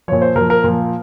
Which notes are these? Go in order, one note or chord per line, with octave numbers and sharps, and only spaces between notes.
A#2 F3 C#5
C5
A#2 F3 A#4
A#4
A#2 F3